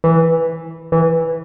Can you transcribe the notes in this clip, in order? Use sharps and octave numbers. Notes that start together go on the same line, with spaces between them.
E3
E3